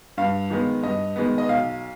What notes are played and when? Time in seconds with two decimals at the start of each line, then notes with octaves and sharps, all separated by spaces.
0.18 G2 F5
0.50 D#3 G#3 B3
0.83 G2 D#5
1.16 D#3 G#3 B3
1.38 D#5
1.49 B1 F5